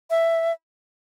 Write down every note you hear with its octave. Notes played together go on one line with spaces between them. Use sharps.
E5